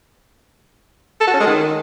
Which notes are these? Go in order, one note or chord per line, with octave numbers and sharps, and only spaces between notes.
A4
F#4
C#4
G#3
D#3